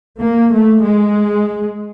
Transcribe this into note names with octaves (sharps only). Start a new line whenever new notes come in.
A#3
A3
G#3